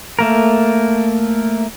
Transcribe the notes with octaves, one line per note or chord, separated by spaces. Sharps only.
A3 A#3 A#4